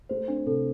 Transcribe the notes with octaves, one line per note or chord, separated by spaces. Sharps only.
A3 C5
C4 D4
C3 A4